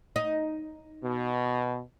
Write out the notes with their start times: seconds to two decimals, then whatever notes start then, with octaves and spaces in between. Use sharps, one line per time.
0.16 D#4
1.03 B2